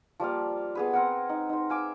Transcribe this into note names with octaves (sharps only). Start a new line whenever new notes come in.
F3 G3 A#3 F5
B3 G#4 B4
C4 A#4 F#5
D#4
D#4 C5
F5 G#5 D6 E6